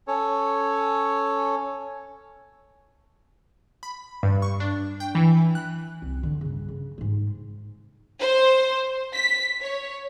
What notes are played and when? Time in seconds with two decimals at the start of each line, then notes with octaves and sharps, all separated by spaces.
0.08 C#4 A4 C#5
3.83 B5
4.23 G2
4.42 C#6
4.60 D4
5.00 G5
5.15 E3
5.55 F#6
6.02 C2
6.23 D3
6.41 G2 C#3
6.68 C#3
6.98 G#2 G#3
8.20 C5
9.14 B6
9.61 C#5